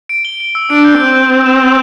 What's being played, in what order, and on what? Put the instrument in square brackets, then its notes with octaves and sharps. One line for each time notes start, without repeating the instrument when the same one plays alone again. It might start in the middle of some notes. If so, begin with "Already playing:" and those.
[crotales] D7
G7
G7
E6
[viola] D4 [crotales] D7
[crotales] G6
[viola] C4 [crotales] G6
[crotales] G6
G6
E7
G6